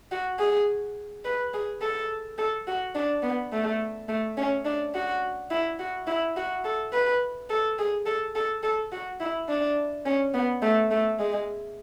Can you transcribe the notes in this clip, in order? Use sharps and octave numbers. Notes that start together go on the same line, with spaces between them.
F#4
G#4
B4
G#4
A4
A4
F#4
D4
B3
A3
A3
C#4
D4
F#4
E4
F#4
E4
F#4
A4
B4
A4
G#4
A4
A4
A4
F#4
E4
D4
C#4
B3
A3
A3
G#3